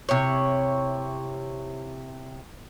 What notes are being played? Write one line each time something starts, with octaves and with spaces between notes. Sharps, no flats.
C3 E4 C#5